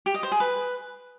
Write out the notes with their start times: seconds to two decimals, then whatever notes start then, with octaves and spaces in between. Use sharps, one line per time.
0.06 G4
0.15 D#5
0.23 C5
0.32 G#4
0.40 B4